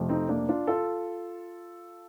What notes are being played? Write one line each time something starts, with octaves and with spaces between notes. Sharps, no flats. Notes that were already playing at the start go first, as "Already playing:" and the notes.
Already playing: F2 C3 F3 A3
C4 D#4
A#3 D4
D4 F4
F4 A4